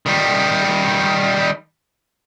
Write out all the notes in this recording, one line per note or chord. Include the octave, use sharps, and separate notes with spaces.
D#3 G3